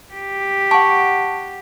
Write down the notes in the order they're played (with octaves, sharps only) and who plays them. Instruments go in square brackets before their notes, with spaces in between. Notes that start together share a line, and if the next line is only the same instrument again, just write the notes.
[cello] G4
[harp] F#5 C#6 [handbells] A5